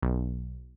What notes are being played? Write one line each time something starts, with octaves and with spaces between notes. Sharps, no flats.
B1